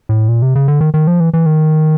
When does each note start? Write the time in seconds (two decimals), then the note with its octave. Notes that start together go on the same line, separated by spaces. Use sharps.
0.09 A2
0.28 A#2
0.42 C3
0.55 C#3
0.68 D3
0.81 D#3
0.94 D#3
1.07 F3
1.20 E3
1.34 E3
1.46 D#3